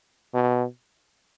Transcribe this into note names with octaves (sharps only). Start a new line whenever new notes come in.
B2